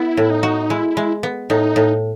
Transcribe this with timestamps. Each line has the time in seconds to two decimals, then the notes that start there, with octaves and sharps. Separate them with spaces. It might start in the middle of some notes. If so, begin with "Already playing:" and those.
Already playing: B3 E4
0.17 A2
0.30 D#4
0.43 F#4
0.70 G#3 E4
0.97 G#3
1.23 B3
1.50 A2 D#4
1.76 A2